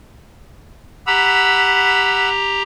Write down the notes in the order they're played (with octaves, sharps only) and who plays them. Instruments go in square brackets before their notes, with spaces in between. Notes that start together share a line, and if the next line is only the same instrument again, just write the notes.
[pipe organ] G4 A#5 [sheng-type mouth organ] F#5 B5 E6